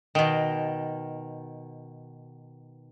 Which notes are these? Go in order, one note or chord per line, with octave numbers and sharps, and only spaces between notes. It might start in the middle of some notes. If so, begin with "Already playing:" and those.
B2 D#3